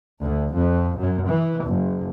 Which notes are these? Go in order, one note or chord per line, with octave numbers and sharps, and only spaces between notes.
D2
F2
F#2
E3
F#1